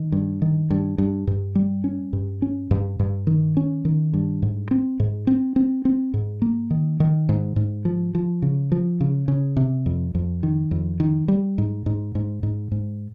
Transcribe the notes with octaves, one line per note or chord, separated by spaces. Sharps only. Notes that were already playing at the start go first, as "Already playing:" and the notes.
Already playing: D#3
G2
D#3
G2
G2
G2
G3
C#4
G2
C#4
G2
G2
D#3
C#4
D#3
G2
G#2
C4
G#2
C4
C4
C4
G#2
A#3
D#3
D#3
G#2
G#2
F3
F3
C#3
F3
C#3
C#3
C3
F2
F2
D#3
F2
D#3
G3
G#2
G#2
G#2
G#2
G#2